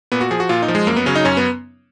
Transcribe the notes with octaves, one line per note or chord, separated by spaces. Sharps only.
A#2 B3
F#4
F3 G#4
F#4
A#2 F4
D#4
F3
G#3
F#2 A#3
B3
C#3 F#3 C#4
D#4
F#2 C#4
B3